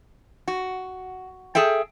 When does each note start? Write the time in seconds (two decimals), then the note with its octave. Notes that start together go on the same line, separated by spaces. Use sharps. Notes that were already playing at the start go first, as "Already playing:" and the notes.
0.48 F#4
1.55 G#4 A4 E5 G5